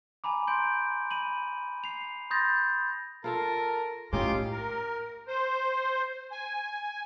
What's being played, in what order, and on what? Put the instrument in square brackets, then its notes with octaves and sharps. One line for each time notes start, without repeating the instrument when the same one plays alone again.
[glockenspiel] G#5 A#5 B5 D6
C6 G6 D7
B5 D#7 F#7
C7 F7
B5 C6 D#6 G6 A6 A#6
[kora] F4 A4 F5 [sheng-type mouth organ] A#4 [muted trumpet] A5
[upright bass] A2 [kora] C#4 D#4 [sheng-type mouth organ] F4 C6 D6 [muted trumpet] G4
[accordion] A#4
C5
G#5